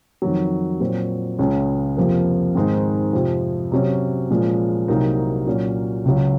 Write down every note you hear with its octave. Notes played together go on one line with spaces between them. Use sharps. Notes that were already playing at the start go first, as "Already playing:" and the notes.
F2 D#3 F#3
A#2 F#3 C4
C#2 C#3 G#3 C#4
F2 C3 F3 A#3
G#2 D#3 G#3 C4 D#4
F2 C3 F3
C3 F#3 C#4
A#2 F3 G#3 C#4
C2 C3 F#3 A#3 D#4
A#2 F#3 C#4
C#2 C#3 F#3